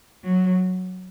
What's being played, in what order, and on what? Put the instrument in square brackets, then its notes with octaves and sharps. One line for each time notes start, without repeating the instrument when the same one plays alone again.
[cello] F#3